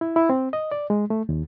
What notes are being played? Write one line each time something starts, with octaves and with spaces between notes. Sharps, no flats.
E4
E4
C4
D#5
D5
G#3
A3
D#2